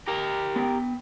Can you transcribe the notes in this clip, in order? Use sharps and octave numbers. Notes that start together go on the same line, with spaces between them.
G4 A#4
B3 G5